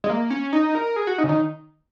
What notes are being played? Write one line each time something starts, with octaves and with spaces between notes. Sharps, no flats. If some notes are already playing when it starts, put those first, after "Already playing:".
G#3
A#3
C#4
D#4
A#4
G#4
F#4
D#4
C#3
D#3